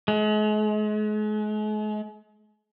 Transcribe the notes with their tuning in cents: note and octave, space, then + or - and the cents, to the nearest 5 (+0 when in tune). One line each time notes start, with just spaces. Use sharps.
G#3 +40